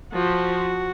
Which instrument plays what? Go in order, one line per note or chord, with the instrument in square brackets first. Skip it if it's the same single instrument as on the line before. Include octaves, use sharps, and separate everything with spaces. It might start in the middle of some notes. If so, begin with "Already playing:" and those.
[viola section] F3 [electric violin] F#4